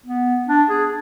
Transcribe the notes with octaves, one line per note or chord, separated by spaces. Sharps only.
B3
D4
G#4